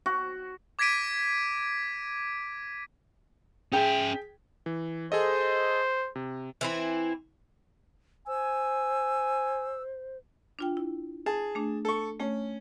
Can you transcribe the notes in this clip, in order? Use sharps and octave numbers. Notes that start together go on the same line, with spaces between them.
F#4
D6 G#6 A#6 B6 D7 D#7
C#4 G#4 E5 G5
E3
G#4 A4 C5 D#5
C3
E3 C4 E4
C5 G#5 E6
D4 F4 G5
E4
G#4 A5
A3 D4
A4 C#6
A3 C#4